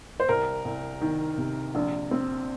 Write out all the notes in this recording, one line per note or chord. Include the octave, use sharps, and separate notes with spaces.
C5
C2 A#4
C2
D#3
C3
A#1
C4